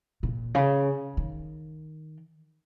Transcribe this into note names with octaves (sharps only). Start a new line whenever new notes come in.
A#2
C#3
D#3